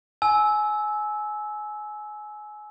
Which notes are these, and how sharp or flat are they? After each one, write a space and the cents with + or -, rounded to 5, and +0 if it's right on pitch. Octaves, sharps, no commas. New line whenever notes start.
G#5 +25 E6 -15